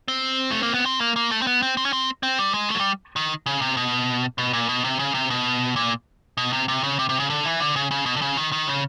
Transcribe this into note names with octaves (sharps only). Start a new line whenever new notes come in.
C4
A3
A#3
B3
C4
A#3
A#3
A3
C4
B3
C4
C4
C#4
C4
C4
G3
G#3
A3
F#3
G3
D#3
C#3
C3
B2
B2
A#2
B2
C3
C#3
C3
B2
A#2
B2
C3
C3
C#3
C3
C3
C#3
D3
E3
D3
C#3
C#3
B2
D3
C#3
D#3
D#3
C#3